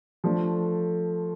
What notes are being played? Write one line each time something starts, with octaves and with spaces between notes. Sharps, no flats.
F3 A3 D4